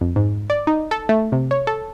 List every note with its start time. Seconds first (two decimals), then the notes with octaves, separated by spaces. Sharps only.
0.01 F2
0.16 G#2
0.50 D5
0.67 D#4
0.91 A4
1.09 A3
1.32 C3
1.51 C#5
1.67 A4